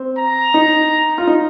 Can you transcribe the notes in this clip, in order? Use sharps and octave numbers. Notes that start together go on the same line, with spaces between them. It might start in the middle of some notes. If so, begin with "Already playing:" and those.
Already playing: C4
A#5
D#4
F4
D#4